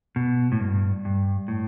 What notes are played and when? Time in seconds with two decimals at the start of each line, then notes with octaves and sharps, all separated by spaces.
0.16 B2
0.52 A2
0.60 G2
1.05 G2
1.48 A2